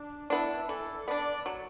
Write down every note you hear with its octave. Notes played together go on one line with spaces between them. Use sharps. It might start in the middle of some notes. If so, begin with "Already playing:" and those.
Already playing: D4
B3 D4 E4
E3 A4
B3 D4 D5
F#3